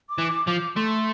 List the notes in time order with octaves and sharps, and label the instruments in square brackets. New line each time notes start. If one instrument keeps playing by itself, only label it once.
[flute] D6
[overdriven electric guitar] E3
[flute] D6
[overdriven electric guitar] F3 [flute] D6
[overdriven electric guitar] A3 [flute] C6